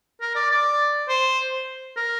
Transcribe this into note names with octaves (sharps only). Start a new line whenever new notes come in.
A#4
D5
D5
C5
A#4